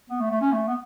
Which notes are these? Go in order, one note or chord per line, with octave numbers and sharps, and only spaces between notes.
B3
A3
A3
C#4
A3
B3